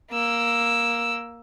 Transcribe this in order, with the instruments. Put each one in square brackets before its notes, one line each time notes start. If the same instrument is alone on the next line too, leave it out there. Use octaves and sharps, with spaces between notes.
[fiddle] A#3 E6